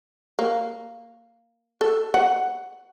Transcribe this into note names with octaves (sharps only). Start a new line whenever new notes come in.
A#3
A4
F#5